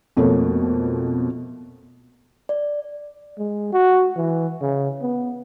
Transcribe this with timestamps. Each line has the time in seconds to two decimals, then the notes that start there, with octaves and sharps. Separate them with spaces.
0.17 F2 B2 A3 A#3 C#5
2.49 D5
3.38 G#3
3.73 F#4
4.16 E3
4.61 C#3
5.02 B3